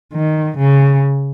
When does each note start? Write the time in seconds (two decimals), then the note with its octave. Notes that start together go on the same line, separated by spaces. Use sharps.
0.13 D#3
0.57 C#3